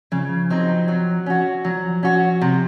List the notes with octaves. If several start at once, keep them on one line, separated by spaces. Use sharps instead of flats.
C#3 F3
F#3 C4 D#4
F#3
C#4 F#4
F3 F#3
C#4 F#4
C3